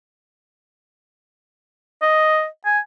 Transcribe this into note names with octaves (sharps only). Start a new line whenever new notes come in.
D#5
G#5